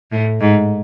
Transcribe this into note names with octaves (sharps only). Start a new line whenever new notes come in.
A2
G#2